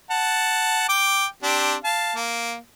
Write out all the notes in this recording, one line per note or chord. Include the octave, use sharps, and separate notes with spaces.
F#5 A5
G5 D6
C4 D4 G4
F5 A5
A#3